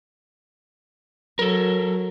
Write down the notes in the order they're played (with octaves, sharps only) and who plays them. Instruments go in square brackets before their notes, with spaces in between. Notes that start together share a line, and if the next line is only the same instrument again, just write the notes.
[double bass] F#3 [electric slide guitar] A4 A#4